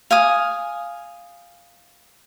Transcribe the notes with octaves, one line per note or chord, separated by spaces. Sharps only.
F5 G#5 D#6